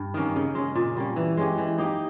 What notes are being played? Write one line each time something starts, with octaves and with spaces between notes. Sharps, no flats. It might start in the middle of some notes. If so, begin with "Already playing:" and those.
Already playing: G2
D#3 A#3 C#4
C#3
G#3 C#4
A#2
G3 A#3 C#4
E3
G#3 C#4 G4
E3
A#3 D#4 G4